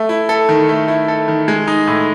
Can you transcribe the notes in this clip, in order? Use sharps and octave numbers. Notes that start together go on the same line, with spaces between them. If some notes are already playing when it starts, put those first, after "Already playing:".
Already playing: A3
E4
A4
D#3
A3
E4
A4
D#3
G#3
D#4
A2